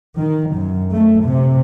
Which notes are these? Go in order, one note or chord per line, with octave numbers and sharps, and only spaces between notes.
D#3
F#2
A3
C3